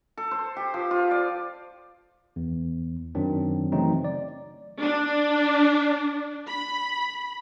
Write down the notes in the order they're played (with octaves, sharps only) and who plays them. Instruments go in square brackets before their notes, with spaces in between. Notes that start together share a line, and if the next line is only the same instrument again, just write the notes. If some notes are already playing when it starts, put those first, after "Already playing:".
[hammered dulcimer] A4
C5
G4
F3
F4
D5
[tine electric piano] E2
F#2 D#3 F#3 C4 D4
C#3 E3 F#3 A3 C4 D#4
D5
[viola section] D4
B5